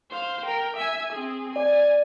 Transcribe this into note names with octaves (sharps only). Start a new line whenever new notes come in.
C5 F5
A#4 G5
E5 G#5
C4 G#4
D5 G#5